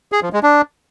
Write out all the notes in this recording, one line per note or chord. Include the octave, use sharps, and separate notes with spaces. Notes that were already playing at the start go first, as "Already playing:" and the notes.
G#4
F3
G#3
D4